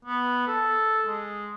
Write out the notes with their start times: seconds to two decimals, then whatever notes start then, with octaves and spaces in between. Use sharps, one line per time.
0.05 B3
0.47 A4
1.06 G#3